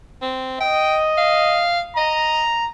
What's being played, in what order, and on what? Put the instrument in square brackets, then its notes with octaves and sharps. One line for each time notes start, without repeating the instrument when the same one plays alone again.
[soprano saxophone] C4
[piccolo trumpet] D#5 [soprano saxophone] G5
[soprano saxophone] F5
[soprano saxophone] D#5 [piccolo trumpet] A#5